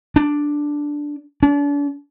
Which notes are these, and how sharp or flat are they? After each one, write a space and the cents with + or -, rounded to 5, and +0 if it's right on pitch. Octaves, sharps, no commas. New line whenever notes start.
D4 +0
D4 -40